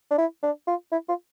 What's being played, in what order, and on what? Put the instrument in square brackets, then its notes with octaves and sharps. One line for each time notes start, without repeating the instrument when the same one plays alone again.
[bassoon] D4
E4
D4
F4
E4
F4